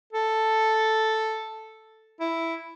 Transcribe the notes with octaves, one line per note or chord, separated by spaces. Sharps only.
A4
E4